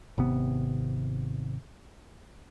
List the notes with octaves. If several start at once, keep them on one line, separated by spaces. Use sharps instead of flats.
G#1 C3 B3